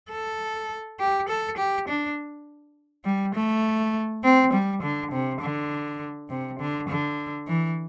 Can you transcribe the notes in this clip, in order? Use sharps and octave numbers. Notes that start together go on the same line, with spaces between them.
A4
G4
A4
G4
D4
G3
A3
C4
G3
D3
C3
D3
C3
D3
D3
E3